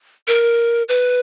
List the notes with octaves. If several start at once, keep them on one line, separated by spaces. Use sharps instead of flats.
A#4
B4